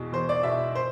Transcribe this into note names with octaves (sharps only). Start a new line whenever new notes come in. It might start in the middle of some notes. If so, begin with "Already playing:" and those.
Already playing: E2 B2
E2 C5
D5
B2 E5
C5